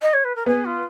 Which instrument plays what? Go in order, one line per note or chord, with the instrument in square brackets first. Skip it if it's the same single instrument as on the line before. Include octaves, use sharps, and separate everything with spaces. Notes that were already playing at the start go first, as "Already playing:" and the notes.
[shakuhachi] D#5
C#5
B4
A#4
[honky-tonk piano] B3 [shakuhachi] G#4
[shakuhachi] F4